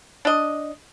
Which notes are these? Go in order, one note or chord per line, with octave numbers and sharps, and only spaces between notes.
D4 D#5